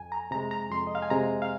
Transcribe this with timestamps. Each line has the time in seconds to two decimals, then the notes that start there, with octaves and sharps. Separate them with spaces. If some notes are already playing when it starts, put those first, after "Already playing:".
Already playing: F2 G#5
0.12 A#5
0.31 C3 G#3 A#5
0.51 A#5
0.71 F2 C6
0.87 D#5
0.95 F5
1.02 G#5
1.10 C3 G#3 A#5
1.42 F5